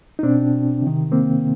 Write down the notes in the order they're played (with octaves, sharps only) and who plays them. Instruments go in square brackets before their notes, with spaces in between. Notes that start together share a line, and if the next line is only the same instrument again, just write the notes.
[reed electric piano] D#4
B2 C4 D4
C3 D#3
A#3 C4